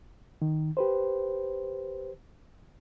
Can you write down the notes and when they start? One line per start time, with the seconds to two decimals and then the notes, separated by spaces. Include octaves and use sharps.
0.42 D#3
0.77 G4 B4 C5